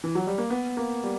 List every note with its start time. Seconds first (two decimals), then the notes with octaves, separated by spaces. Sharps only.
0.04 E3
0.15 F#3
0.27 G3
0.38 A#3
0.50 B3
0.77 A#3
1.04 G3